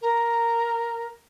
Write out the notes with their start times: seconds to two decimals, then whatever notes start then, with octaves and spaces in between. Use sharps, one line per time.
0.02 A#4